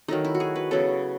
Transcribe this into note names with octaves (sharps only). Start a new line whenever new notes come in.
D#3 F#3 A3 D#4
E4
F#4
G#4
B4
C#3 F#3 B3 A4